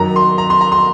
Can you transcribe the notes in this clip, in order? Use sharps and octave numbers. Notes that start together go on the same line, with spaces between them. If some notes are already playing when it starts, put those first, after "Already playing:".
Already playing: F#2 D#3 F#3 A#5
C6
A#5
C6
A#5
C6